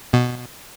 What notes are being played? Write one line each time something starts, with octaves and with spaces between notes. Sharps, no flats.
B2